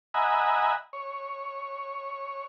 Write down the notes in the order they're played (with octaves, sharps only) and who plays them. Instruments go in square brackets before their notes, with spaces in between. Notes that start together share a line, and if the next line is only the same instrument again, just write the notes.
[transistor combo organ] D#5 E5 F#5 G#5 A#5 B5
C#5